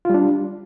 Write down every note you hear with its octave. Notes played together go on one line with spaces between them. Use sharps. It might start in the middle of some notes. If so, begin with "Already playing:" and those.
G3 D4 F4